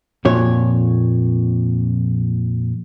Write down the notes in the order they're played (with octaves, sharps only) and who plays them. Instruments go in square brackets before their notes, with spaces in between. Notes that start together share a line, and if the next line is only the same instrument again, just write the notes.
[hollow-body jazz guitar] F2 A#2 C#5